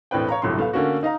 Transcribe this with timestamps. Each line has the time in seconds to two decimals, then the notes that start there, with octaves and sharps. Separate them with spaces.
0.11 E1 A2 C4 D4 B4 G5
0.29 C#5 F5 A#5
0.42 G1 C2 A2 F#3 C6
0.58 A3 B3 F5
0.73 D3 A3 A#3 C#4 F#4
1.03 D#4 D#5 F5 A#5 D#6